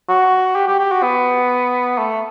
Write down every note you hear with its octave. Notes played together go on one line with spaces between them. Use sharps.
F#4
G4
G4
G4
F#4
B3
A3